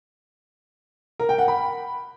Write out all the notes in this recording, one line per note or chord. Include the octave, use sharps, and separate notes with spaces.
A#4
G5
F#5
B5